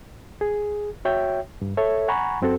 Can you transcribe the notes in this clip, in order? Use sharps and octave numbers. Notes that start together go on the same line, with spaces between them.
G#4
F#4 C#5 E5 G5
G2
A4 C#5 E5
F#5 G#5 A#5 B5 C#6
F#2 C4 F#4 A4